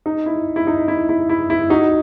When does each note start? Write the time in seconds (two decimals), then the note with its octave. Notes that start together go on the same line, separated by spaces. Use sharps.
0.06 D#4
0.26 E4
0.56 E4
0.67 D#4
0.88 E4
1.09 E4
1.29 E4
1.50 E4
1.70 D#4 F#4